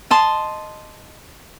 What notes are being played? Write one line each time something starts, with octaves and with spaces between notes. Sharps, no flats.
D#5 A5 C6